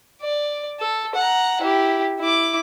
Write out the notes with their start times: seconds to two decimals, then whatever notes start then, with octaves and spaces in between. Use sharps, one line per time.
0.22 D5
0.80 A4
1.15 F#5 A#5
1.62 E4 G4
2.19 E4 D6